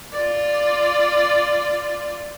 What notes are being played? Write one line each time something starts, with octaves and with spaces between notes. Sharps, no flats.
F4 D5